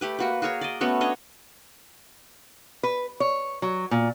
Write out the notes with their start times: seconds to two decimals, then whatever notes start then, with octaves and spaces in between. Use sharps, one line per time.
0.01 A3 G4 B4
0.19 A#3 F#4 B4
0.42 F#4 G#4 A#4 C#5
0.61 D5 D#5
0.81 A3 B3 C#4 F#4
1.01 D4 C#5 D#5 F#5
2.83 B4
3.20 C#5
3.62 F#3
3.91 A#2